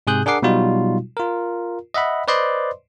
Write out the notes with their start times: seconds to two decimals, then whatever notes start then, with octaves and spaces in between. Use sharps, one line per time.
0.07 G#2 C3 G#4 D#6 F#6 G6
0.26 D4 G#4 A#4 F#5 D6 C7
0.42 B2 F#3 G3 D#4 F4 F#4
1.17 F4 A#4
1.94 D#5 E5 F#5 B5
2.28 B4 C5 D5 D#5 C6